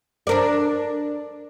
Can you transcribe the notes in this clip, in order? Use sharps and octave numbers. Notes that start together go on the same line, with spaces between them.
D4 A#4 D5